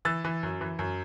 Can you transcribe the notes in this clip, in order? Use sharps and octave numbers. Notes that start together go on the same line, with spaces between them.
E3 E6 A6
E3
F#2
E3
F#2